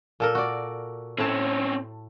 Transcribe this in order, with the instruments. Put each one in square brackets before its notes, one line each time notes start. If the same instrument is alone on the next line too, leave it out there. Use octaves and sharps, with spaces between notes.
[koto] A#2 A4 A#4
F#4 D5
[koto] A2 A5 [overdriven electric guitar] C4 C#4